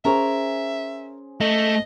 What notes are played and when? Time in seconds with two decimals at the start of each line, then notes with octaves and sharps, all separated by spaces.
0.05 C#4 G#4 A#4 C5 C#5 E5
1.41 A3 D#5